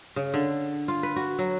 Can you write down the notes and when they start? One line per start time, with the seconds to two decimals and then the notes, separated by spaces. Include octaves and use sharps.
0.16 C#3
0.34 D3
0.88 F4
1.03 B4
1.16 F#4
1.39 F#3